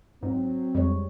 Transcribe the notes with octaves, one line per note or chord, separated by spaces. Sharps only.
G#2 F#3 C4
F2 G3 G#3 C#5